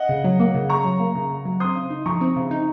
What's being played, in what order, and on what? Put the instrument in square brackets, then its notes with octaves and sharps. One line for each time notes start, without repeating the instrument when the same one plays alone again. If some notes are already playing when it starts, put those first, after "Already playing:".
Already playing: [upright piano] D#5 F#5
[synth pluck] C#3
F#3
A#3
C#3
[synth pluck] C#3 [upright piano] A#5 C#6
[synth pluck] F#3
A#3
C#3
C#3
F#3
[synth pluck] C4 [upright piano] C6 D#6
[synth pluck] C#3
D#4
[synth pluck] F3 [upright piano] A#5 C#6
[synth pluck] C4
C#3
D#4